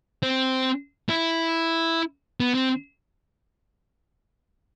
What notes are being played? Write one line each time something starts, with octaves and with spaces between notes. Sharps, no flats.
C4
E4
B3
C4